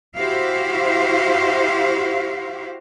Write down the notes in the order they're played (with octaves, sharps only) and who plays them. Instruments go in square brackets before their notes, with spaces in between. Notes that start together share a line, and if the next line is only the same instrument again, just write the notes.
[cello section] E4 F#4 G4 C5 F5